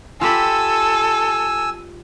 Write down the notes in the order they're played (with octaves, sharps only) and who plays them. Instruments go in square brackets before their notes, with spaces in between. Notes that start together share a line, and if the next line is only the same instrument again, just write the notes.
[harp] F4 G4 B5 [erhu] A4 [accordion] G#5 E6